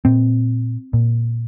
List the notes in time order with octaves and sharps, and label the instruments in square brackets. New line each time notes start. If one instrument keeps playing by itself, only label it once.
[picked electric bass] A#2 C4
A#2